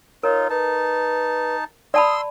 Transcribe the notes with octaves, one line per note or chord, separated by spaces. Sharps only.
D#4 F4 A#4 C#5
D#4 B4 A5
D5 A5 B5 C6 D#6 E6